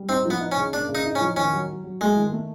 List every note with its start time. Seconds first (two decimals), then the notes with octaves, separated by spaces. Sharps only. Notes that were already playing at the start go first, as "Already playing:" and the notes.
Already playing: G3
0.09 C4 D#4
0.25 F3 B3
0.41 D#4
0.52 C#4
0.57 C#3
0.73 A#3 D4
0.89 C#3
0.95 D#4
1.05 D#4
1.15 C#4
1.21 F3
1.37 D#3 C#4
1.53 F#3
1.68 F#3
1.84 F#3
2.01 G#3 A3
2.16 D#3
2.32 A3